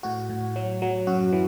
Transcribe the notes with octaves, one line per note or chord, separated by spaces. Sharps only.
A2 F#4
A2
F#3
F#3
F#2 F#4
E3